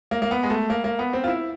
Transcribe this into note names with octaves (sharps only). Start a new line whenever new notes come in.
A#3
A#3
B3
G#3
A3
A#3
A#3
B3
C4
F4
E4